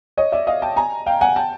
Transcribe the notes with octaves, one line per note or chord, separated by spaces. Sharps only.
C#5 D#5
D5 E5
D#5 F5
G5 A5
G#5 A#5
F5 G5
F#5 G#5
G5 A5